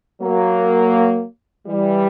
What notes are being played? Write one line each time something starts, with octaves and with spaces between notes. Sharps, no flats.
F#3 A#3
E3 G3